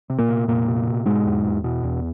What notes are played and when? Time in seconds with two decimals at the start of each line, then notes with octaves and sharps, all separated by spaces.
0.10 C3
0.19 A#2 A#3
0.29 C3
0.47 F2 A#2 A#3
0.67 C3
0.87 C3
1.06 G#2 B2 G#3
1.26 E2
1.45 E2
1.64 B2
1.84 E2